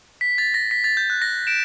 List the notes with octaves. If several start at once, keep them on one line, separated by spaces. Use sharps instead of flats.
B6
A6
A#6
B6
A6
G6
F#6
A#6
D7 E7